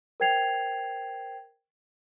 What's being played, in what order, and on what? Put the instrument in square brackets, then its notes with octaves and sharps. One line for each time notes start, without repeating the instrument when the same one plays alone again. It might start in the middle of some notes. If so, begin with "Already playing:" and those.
[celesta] A#4 C5 G5 G#6 C7 F7